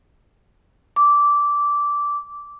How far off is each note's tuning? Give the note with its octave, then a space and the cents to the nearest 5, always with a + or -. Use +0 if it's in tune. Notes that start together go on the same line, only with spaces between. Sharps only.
D6 -10